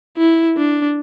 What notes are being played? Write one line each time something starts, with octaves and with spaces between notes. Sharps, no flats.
E4
D4